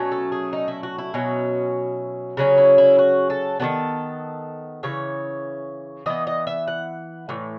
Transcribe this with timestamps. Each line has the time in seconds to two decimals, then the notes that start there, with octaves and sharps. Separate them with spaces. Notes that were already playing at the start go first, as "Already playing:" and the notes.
Already playing: B2 F#3 A3 C#4
0.12 A4
0.32 G#4
0.53 D#4
0.68 E4
0.83 F#4
0.98 E4
1.14 B2 F#3 C#4
2.37 C#3 F#3 C#4
2.58 E4
2.78 E4
2.99 F#4
3.30 A4
3.60 D#3 F#3 B3 A4
4.83 C#3 E3 C#5
6.06 E3 B3 D#5
6.27 D#5
6.47 E5
6.67 F#5
7.29 A2 E3